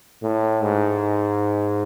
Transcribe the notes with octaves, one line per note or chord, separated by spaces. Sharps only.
A2
G#2